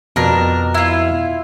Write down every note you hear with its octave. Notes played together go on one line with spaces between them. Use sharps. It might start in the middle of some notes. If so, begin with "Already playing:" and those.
F2 B2 D4 A#4
E4 F4